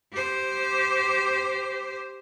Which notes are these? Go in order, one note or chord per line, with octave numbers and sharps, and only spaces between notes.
G4 C5